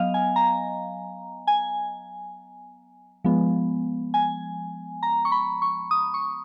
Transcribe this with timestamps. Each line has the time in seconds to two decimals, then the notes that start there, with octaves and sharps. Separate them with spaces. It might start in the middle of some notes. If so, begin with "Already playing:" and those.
Already playing: F#3 B3 D#5 F5
0.14 G#5
0.36 A#5
1.47 G#5
3.24 F3 G#3 B3
4.14 G#5
5.03 A#5
5.25 C#6
5.32 B5
5.62 C#6
5.91 D#6
6.14 C#6